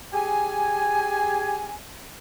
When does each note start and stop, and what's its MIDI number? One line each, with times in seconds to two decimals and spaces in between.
0.13 1.76 67
0.13 1.76 68
0.13 1.76 80